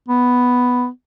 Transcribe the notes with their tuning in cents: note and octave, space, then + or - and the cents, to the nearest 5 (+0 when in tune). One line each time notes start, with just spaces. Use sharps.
B3 +5